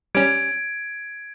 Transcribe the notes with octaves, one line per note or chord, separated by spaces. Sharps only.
G3 C#4 G#6 D7